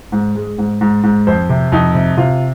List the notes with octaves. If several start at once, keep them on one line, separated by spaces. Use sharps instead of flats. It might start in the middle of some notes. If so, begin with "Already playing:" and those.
G#2
G#3
G#2
G#2
G#2
F2 C5
C3
F2 D#4
C3
C3 F4